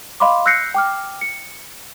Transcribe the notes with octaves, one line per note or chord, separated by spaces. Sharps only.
D#5 F5 B5 C6 D6
E6 F#6 G6 A#6 C7 C#7
G5 D6 F6
C#7